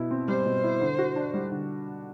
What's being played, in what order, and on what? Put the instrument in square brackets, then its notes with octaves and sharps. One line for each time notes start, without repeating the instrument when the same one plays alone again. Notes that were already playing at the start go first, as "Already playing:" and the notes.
Already playing: [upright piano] B2 E4
C4
[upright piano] G3 [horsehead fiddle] C5
[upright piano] B2
E4
D3
F#4
D4
G3
D3